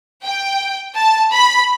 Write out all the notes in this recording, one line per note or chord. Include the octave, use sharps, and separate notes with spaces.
G5
A5
B5